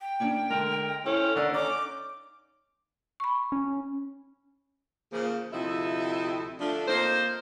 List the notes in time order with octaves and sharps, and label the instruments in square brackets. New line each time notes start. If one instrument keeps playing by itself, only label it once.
[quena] G5
[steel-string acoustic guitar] A#3 C#4 D4
[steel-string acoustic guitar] D3 G#3 [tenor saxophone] A#4
[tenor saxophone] C#4 [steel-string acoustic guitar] E4 A4 C5
[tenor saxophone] D3 [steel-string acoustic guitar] D#3 D#4 D5
[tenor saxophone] C#4 [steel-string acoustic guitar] D#4 [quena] D6
[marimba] B5 C#6
[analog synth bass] C#4
[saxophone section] C#3 F3 A#3
D2 C3 F3 D#4 E4 E5
D3 F3 A3 D4
F2 A#3 D#4 C5